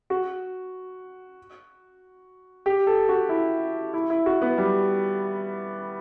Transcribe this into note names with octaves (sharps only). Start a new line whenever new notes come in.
F#4
G4
A4
F#4
E4
E4
E4
F#4
B3
G3